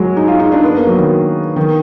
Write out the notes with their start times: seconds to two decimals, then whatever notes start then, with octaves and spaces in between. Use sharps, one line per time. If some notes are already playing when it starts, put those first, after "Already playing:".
Already playing: F#3 G#3
0.17 D#4
0.28 F4
0.39 D#4
0.52 D4
0.63 B3
0.75 A#3
0.87 F#3
0.98 D#3
1.56 D#3